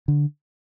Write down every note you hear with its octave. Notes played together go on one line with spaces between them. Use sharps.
D3